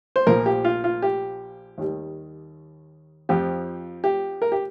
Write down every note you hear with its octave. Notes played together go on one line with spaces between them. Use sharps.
C5
A#1 A#2 F3 A#4
G4
F4
F4
G4
D#2 D#3 G3
F2 F3 G4
G4
A#4
G4